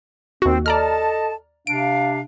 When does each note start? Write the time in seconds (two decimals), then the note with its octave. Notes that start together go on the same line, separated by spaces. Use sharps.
0.42 D#2 C4 F#4
0.66 A4 D5 D#5 A5 A#5 F6
1.67 C3 D4 F5 D7